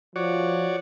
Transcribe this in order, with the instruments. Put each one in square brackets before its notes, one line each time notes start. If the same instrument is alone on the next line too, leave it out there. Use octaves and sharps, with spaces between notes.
[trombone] F3 [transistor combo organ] F#4 C#5 D5